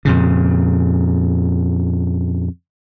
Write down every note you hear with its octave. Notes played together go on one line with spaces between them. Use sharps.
F2 A#2 C#3